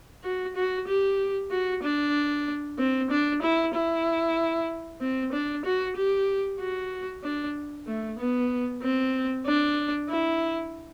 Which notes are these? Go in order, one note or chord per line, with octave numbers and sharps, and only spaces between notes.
F#4
F#4
G4
F#4
D4
C4
D4
E4
E4
C4
D4
F#4
G4
F#4
D4
A3
B3
C4
D4
E4